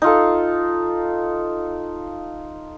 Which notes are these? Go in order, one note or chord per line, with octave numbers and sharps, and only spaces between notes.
D#4 F4 A4